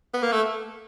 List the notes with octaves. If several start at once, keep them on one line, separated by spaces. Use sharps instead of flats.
B3
A#3
A3